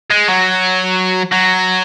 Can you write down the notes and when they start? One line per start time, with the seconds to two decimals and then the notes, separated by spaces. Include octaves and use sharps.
0.10 G#3
0.28 F#3
1.32 F#3